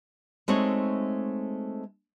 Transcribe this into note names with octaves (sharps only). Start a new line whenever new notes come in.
G#3 A3 C4 D#4 F#4 C#5